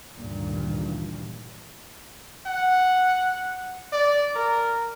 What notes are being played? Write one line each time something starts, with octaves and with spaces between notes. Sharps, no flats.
D2 G2 A#2 D#3 E3
F#5
D5
A#4